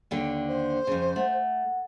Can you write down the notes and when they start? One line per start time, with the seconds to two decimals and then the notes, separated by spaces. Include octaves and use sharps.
0.11 D#2 D3 G5
0.48 C5
0.87 F2 C#3
1.16 A3 F#5